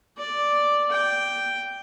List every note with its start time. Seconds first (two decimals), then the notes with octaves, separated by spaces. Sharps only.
0.18 D5
0.91 G5